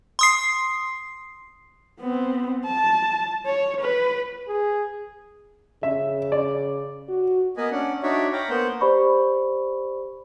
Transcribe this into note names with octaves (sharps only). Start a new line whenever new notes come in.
C6 D#6 C7
B3 C4
A5
C#5
B4
G#4
C#3 E5
D5
F#4
A#3 B3 B4 D#5 G#5
C#4 D4 F#5
D4 D#4 F#4 C#5 D5 E5
C#5 F5 G5 A#5 B5
A#3 B3 C5 F#5 G6
G4 C5 D5 B5 C#6